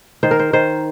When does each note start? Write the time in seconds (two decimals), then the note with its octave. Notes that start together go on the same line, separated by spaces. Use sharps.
0.23 D#3 C5
0.31 A#4
0.39 C5
0.53 D#3 C5